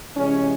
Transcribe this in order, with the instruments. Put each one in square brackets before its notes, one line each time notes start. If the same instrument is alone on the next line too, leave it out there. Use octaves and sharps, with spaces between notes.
[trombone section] C3 E3 G#3 C#4